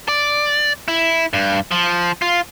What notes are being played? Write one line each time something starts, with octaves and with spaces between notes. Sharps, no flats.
D5
E4
G2
F3
F4